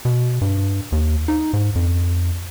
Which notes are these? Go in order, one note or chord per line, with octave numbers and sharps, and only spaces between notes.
B2
G2
D#2
D#4
G#2
F2